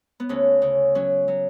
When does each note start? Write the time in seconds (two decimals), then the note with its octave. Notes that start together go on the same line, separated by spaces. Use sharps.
0.20 B3
0.29 D2 C#4
0.62 C#3
0.95 F#3 C#4
1.28 F#3